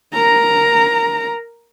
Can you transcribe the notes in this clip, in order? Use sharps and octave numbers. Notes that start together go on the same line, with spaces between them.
A#4 A#5